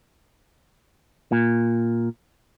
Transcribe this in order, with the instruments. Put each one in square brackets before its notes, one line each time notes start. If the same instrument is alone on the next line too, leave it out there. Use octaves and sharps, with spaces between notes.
[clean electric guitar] A#2